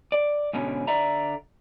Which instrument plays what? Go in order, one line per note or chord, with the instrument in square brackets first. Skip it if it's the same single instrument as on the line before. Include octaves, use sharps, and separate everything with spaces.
[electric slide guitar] D5
G#2 B2 D3 C#4
D3 D5 E5 A#5